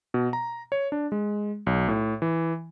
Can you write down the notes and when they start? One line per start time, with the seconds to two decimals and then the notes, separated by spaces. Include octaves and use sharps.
0.14 B2
0.33 A#5
0.72 C#5
0.92 D4
1.12 G#3
1.67 B1
1.88 A2
2.22 E3